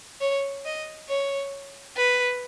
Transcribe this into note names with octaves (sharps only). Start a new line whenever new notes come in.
C#5
D#5
C#5
B4